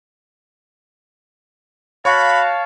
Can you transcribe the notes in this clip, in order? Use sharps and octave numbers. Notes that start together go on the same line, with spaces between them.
F#4 C#5 F5 A5 B5 C#6